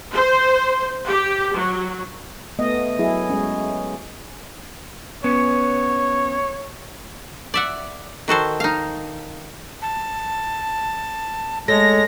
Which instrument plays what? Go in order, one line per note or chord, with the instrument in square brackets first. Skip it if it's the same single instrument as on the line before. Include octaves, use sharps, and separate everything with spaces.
[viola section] C5
G4
F#3
[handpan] A3 B3 D#5
F#3 E4 G#4
G#3 C#4
[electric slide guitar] B3 C#4 [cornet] C#5
[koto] D5 E5 F#5
D#3 F#4 A4 C5
D#4 F5
[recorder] A5
[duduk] G#3 [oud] A3 [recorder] C#5 [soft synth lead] A#6